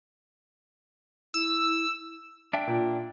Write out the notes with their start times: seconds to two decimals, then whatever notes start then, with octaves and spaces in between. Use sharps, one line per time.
1.34 E4 E6
2.53 D4 E5 G5
2.67 A#2